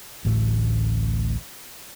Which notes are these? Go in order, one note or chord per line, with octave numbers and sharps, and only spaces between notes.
A1 D2 A2 A3